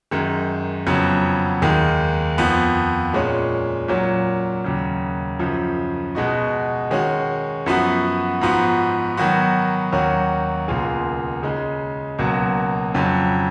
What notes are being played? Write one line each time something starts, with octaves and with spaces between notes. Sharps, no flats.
F#2 D#3 G#3
F2 C#3 F#3 B3
D#2 D#3 G#3
F2 F3 B3
A#2 G#3 C#4
A#2 F#3 C#4
D#2 C#3 F#3
F#2 C#3 F3
B2 G#3 D#4 F#4
D#3 G#3 C#4 F#4
F#2 F3 B3 F#4
G#2 F3 B3 F#4
D#3 F#3 B3 F#4
D#2 D#3 F#3 C#4 F#4
C#2 B2 A#3 F4 G#4
C#3 G#3 D#4
C#2 B2 F#3 A#3
F2 C#3 F#3